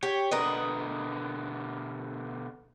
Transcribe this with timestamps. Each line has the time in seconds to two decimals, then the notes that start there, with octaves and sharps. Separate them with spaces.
0.03 G4 C#5
0.31 B2 D3 B3 A#4 B4 D#5